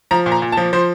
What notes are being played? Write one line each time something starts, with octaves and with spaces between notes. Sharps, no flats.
F3 A#5
A#2
A#5
A#2
A5
F3
F3 C5